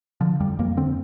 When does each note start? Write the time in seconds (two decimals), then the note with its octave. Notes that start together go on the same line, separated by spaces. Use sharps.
0.21 D3 F3
0.40 F2 G3
0.59 F2 A#3
0.77 D3 C4